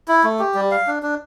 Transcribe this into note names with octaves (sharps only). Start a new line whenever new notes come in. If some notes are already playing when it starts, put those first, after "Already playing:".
E4
A3
G4
G3
F5
D4
D4